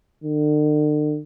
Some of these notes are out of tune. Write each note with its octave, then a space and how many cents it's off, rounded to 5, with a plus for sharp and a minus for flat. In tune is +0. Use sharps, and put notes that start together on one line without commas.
D3 +40